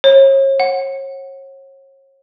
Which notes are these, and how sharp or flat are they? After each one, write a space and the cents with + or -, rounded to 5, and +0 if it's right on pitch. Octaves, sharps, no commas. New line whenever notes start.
C#5 -35
F#5 +0